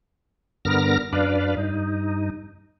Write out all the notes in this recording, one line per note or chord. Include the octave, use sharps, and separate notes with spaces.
G2 D3 B3 A#4 F6 A#6
F#2 D4 B4 D5 F5
G2 D#4